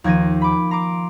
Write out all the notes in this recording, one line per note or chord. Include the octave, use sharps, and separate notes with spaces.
D#2 F3 G#6 A#6 D#7
B5 D6
A#5 C6 D6 D7